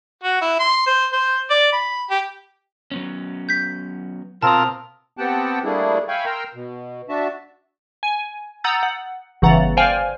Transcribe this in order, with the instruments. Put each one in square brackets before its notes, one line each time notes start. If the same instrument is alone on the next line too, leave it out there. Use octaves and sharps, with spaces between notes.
[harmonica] F#4
E4
C6
C5
C5
D5
B5
G4
[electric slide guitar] F#3 B3 C#4
[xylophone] G6 B6
[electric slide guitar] B2 A#5 [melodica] C4 F4 A#4 [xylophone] A5 D#6
[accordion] B3 C4 G4 F#5 G5 A5
G3 A3 A#3 D4 E4 G#4
E5 F5 G5 G#5 B5 C#6
A#4 G5 A#5 C6 E6
B2
D4 F#4 E5 A5
[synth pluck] G#5
F#5 A#5 D#6 E6 G6 A6
F#5
G1 C#3 E3 F#5 A#5 A6
C5 D5 F5 G5 G#5 F6